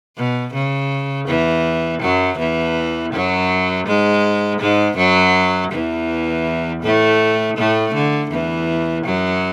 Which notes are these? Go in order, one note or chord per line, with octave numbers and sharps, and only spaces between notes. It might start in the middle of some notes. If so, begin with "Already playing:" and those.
B2
C#3
E2 E3
F#2 F#3
E2 E3
F#2 F#3
G#2 G#3
G#2 G#3
F#2 F#3
E2 E3
A2 A3
A2 A3
D3
E2 E3
F#2 F#3